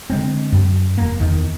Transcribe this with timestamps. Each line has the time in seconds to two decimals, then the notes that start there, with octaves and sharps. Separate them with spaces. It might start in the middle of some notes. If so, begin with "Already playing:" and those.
0.10 D3 G#3 C4
0.52 F#2
0.98 E1 A#3
1.20 E2 D#3